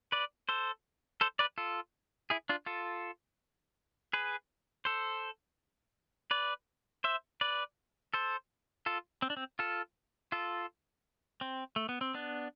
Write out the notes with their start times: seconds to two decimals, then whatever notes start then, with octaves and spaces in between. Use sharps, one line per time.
0.12 B4 D5
0.49 A4 C5
1.21 A4 C5
1.39 B4 D5
1.58 F4 A4
2.30 E4 G#4
2.49 D4 F4
2.66 F4 A4
4.13 G#4 B4
4.85 A4 C5
6.31 B4 D5
7.04 C5 E5
7.41 B4 D5
8.14 A4 C5
8.86 F4 A4
9.22 C4
9.30 D4
9.37 C4
9.59 F4 A4
10.32 F4 A4
11.41 C4
11.76 A3
11.89 B3
12.01 C4
12.14 B3 D4